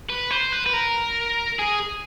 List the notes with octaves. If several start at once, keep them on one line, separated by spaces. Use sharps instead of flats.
B4
C5
B4
B4
A#4
G#4